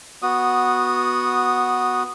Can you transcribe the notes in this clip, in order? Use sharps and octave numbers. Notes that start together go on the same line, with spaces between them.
B3 F#4 D#6